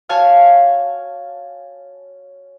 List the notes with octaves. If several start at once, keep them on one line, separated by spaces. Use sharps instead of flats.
F#4 C#5 F5 G#5 A5 F6